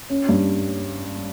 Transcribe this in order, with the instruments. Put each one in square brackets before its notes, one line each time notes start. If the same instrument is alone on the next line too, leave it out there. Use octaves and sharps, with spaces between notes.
[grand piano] C#4
G2